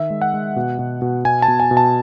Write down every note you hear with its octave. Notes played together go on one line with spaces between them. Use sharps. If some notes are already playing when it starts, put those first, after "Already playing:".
Already playing: D#3 E5
G#3
F#5
G#3
B2
B2
B2
B2 G#5
A5
B2
G#5
B2
A5